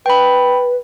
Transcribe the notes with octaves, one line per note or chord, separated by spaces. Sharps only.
B4 G5 B5